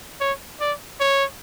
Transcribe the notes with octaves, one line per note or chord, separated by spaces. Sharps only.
C#5
D5
C#5